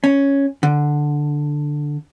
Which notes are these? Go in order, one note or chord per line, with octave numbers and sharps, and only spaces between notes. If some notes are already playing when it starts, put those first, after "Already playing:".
C#4
D3